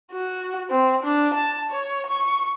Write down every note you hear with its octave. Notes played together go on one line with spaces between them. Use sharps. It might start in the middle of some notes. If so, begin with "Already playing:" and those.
F#4
C4
D4
A5
C#5
C#6